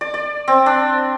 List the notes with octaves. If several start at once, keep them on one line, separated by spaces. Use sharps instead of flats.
D5
D5
C4
D4